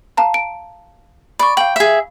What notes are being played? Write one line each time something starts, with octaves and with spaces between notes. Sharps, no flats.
F5 A5 A#5
D7
D5 B5 C#6
F5 G5 F#7
G#4 E5